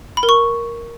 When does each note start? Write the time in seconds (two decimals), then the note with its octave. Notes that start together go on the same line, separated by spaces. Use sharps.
0.17 B5
0.23 A#4
0.29 C#6